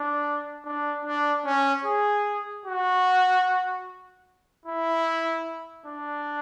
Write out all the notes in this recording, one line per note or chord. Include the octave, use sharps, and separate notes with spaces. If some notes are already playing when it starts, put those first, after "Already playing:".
Already playing: D4
D4
D4
C#4
G#4
F#4
E4
D4